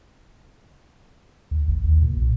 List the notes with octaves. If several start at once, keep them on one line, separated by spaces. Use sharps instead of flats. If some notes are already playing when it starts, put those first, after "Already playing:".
D2
G#1
D#2
A#2
B1